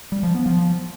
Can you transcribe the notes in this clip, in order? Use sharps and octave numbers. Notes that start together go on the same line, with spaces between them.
G3
F3
B3
F3